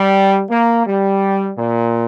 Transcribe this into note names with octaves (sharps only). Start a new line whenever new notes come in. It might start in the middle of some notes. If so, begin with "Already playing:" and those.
Already playing: G3
A#3
G3
A#2